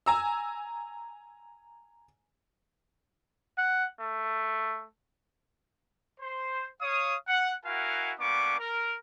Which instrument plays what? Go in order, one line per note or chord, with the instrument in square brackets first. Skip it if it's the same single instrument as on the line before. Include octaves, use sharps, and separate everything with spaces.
[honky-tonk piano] G#5 A#5 E6
[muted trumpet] F#5
A3
[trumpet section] C5
C#5 F5 D#6
F#5
E4 F#4 A#4 F5 F#5 G#5
G3 A#3 B3 D4 C#6 D6
A#4